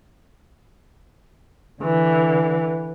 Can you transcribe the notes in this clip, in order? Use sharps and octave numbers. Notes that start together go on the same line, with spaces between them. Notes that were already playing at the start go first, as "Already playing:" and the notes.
D3 E3